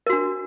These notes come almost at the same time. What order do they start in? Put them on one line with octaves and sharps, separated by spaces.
A#4 F#4 D4